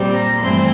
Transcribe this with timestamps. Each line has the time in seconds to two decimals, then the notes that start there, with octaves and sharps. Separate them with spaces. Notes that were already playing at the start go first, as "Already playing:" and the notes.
Already playing: A#2 G3 C4
0.12 A#5
0.39 G2 E3 A3 C4 C6